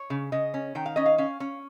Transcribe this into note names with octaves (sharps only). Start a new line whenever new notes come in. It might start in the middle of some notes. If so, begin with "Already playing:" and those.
Already playing: C#5
C#3
C#3 D#5
C#4
D#3 G5
F5
C#4 D#5
F5
C#4 F5
C#4